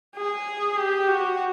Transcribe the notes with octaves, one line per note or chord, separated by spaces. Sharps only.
G#4
G4
F#4